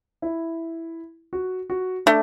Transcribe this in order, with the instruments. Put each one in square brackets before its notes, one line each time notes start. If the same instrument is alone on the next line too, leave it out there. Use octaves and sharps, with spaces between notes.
[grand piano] E4
F#4
F#4
[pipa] A3 [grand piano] D4